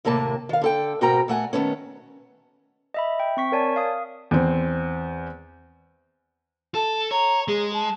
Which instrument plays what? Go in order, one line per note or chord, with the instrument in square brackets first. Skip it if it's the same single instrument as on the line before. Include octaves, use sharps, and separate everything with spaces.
[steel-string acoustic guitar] D#2 A2 C3 A#3 A5
D#3 F5
D3 A4 G5
G#2 B2 F#4 A#4 G5 A#5
A#2 A3 F#5 G#5
D#3 F#3 A3 B3 C#4
[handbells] D#5 E5 B5
G5
C4 C#6 B6
A#4 C#5 D5 G#5 A5
F5 D#6
[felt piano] E2 C4
[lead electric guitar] A4 [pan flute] A5
[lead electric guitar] C#5 [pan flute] A#5
[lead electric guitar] G#3 [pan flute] G#4
[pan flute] A5